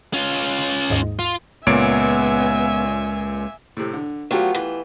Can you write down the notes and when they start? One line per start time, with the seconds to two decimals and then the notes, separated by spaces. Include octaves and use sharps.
0.14 C#4 F4
0.90 D#2 G#2 D#5
1.19 F4
1.67 C#2 A#2 B3 C#5 E5 G#5 D7
3.77 A2 C3
3.93 D3
4.31 F#3 A3 B3 F4 G4
4.55 E3